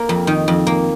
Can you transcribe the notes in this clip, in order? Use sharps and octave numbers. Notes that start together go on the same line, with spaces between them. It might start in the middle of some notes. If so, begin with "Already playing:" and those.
Already playing: A#3 A#4
F2
D#3
F2
A#3